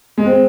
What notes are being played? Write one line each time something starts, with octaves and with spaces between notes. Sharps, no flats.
G#3
C4